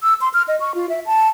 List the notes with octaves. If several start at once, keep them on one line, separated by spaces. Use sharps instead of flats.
E6
C6
F6
D#5
C#6
F4
E5
A5